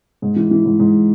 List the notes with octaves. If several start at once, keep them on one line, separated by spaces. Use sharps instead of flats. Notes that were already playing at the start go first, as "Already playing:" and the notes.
G#2
E3
E3
G#2
G#2